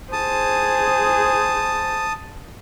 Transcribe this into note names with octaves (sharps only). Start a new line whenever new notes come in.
G#4 C5 A5 D#6